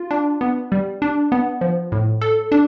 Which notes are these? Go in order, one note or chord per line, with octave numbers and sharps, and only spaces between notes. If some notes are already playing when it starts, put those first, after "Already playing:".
Already playing: F4
D4
B3
G3
D4
B3
F3
A2
A4
D4